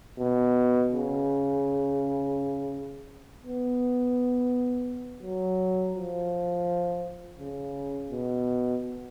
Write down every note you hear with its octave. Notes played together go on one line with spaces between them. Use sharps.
B2
C#3
B3
F#3
F3
C#3
B2